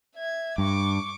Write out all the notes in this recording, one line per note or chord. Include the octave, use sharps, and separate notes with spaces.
E5 G#6
G2 C#6 D6